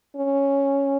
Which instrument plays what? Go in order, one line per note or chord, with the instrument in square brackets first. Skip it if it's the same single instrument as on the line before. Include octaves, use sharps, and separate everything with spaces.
[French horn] C#4